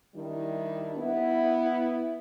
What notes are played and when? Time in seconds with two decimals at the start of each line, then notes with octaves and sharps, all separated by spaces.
0.15 D#3 G3 D4 E4
0.96 B3 E4